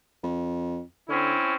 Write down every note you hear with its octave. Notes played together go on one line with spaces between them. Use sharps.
F2
D3 C4 C#4 E4